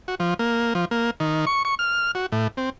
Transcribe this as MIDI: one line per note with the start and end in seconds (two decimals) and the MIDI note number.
0.08 0.15 66
0.20 0.34 53
0.39 0.73 58
0.75 0.85 53
0.91 1.11 58
1.20 1.45 51
1.47 1.63 85
1.65 1.75 85
1.79 2.11 89
2.15 2.26 66
2.32 2.48 45
2.57 2.70 60